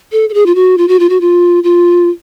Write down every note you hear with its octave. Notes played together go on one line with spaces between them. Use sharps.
A4
A4
G#4
F4
F#4
F4
F#4
F4
F#4
F4
F4